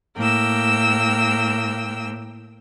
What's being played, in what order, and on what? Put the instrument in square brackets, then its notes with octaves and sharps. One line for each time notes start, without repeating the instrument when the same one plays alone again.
[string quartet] A2 A#3 G5 E6